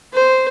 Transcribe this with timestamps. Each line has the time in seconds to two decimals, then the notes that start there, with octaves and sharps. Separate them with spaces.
0.13 C5